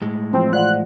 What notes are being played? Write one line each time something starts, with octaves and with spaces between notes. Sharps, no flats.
A2 G#3
E3 F3 C4
E3 F4 C5 D5 F#5 F#6